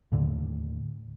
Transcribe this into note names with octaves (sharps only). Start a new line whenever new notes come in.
D#2 A2 D3